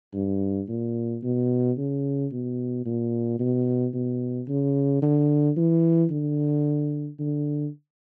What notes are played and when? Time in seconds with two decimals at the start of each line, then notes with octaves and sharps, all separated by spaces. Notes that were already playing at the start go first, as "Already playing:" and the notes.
0.14 G2
0.69 A#2
1.23 B2
1.78 C#3
2.32 B2
2.86 A#2
3.39 B2
3.94 B2
4.48 C#3
5.02 D3
5.57 E3
6.11 D3
7.19 D3